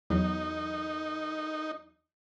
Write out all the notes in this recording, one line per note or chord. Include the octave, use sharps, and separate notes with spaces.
E2 F#3 D#4